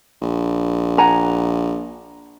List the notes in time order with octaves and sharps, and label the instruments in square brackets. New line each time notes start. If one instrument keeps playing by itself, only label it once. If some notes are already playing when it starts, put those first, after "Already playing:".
[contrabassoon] A#1
[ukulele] F#5 G#5 A#5